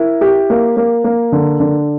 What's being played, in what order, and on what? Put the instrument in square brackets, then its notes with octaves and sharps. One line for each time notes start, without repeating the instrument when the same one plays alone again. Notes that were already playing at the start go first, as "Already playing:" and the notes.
Already playing: [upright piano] E4 A#4
G4
A#3
A#3
A#3
D3
D3